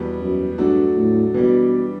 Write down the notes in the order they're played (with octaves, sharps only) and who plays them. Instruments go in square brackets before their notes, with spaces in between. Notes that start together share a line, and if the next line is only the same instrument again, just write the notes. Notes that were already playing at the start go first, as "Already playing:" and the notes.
Already playing: [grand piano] E2 B2 G3 B3
[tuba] F#2
[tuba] G2 [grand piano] F#3 A3 D4 F#4 A4
[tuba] A2
[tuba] B2 [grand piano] E3 G3 D4